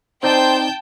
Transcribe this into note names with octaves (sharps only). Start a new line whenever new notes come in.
C4 D#4 C5 D5 G5 A5 G6